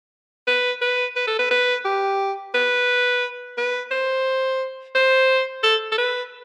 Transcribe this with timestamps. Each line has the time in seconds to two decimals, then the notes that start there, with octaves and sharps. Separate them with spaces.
0.47 B4
0.81 B4
1.16 B4
1.27 A4
1.39 B4
1.51 B4
1.85 G4
2.54 B4
3.57 B4
3.91 C5
4.95 C5
5.63 A4
5.92 A4
5.98 B4